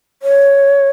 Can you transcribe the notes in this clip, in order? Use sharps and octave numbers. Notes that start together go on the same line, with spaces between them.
C#5